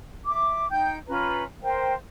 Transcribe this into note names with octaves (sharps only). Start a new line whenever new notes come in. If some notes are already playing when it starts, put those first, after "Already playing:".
E5 D6
D#4 G5 G6
C#4 F4 B4 A#5
A#4 C5 F5 G5